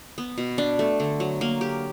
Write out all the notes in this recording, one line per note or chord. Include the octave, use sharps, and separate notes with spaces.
B3
B2
D4
A3
D3
F#3
A#3
G4